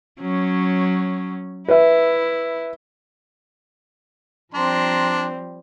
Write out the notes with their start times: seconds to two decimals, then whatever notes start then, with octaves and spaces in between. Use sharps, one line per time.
0.20 F#3 C#4
1.68 E4 B4 E5
4.54 F3 G3 C4 D4 A#5 C6